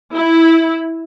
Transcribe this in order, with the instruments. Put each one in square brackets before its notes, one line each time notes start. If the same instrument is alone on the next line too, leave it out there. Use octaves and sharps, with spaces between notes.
[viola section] E4